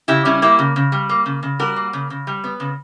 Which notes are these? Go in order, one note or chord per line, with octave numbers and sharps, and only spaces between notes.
C#3 E4 G4
G3 C#4 E4
A#3 E4 G4
C#3
C#3
G3
A#3
C#3
C#3
G3 F#4 A#4
A#3
C#3
C#3
G3
B3
C#3